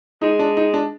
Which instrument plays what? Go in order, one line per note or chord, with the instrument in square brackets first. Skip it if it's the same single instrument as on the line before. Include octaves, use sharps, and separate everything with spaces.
[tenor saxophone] G#3 [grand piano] D#4
[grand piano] D4
D#4
D4